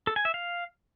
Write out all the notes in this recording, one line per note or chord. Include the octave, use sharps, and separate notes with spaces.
A4
G#5
E5
F5